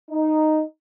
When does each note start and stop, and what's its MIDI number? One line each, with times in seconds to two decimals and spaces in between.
0.11 0.62 63